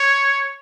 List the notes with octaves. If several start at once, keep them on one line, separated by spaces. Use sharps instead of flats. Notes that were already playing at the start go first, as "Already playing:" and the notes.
Already playing: C#5